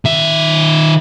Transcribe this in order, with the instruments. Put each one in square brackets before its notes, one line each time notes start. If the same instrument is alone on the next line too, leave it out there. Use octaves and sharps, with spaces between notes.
[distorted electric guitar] D#3 E5